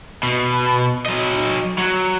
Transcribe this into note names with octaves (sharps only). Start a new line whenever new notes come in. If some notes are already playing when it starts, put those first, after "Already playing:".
B2
F#3 D#5
F#3